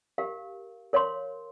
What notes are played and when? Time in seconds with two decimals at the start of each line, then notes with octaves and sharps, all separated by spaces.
0.18 G4 A#4 F5
0.93 A#4 C#5 F5 C6